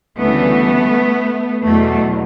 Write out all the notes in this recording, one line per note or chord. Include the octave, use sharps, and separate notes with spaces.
D2 C#3 E3 G3 A3 B3
E2 B2 F#3 A3